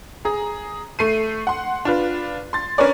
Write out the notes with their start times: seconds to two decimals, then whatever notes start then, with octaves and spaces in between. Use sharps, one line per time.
0.25 G#4 A#5
0.99 A3 C7 D#7
1.47 F#5 C6
1.85 D4 F4 B4
2.53 C6 A6
2.78 C#4 D4 A#4 B4 C#5 D5